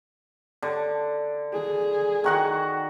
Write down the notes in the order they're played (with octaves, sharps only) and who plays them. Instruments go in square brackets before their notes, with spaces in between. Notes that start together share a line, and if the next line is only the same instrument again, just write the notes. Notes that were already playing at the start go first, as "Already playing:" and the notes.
[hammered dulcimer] D3
[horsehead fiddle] G#4
[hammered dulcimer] D#3 F#4 F#5